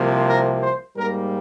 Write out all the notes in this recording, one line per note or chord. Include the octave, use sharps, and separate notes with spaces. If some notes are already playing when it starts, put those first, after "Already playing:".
Already playing: C2 C3 F3 A#3
A#4
C5
G#2 G3 A#3 A#4